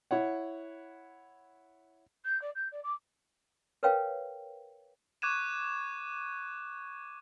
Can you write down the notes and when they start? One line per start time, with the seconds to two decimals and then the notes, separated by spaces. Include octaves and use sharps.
0.11 E4 C#5 F#5
2.25 G6
2.41 D5
2.55 G6
2.71 D5
2.83 D6
3.83 A#4 B4 C#5 F5 G5
5.22 C#6 D6 F#6 G#6 D#7 E7